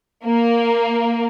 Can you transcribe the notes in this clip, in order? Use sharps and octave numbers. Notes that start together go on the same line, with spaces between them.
A#3